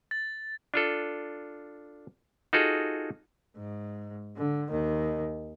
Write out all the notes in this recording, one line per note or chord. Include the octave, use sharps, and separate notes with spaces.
A6
D4 F4 A4
D#4 F4 F#4 G#4 A4
G#2
D3
D#2 D#3